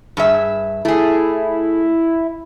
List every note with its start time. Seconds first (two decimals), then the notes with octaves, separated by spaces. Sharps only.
0.17 G2 G#4 E5
0.85 A3 E4 G#4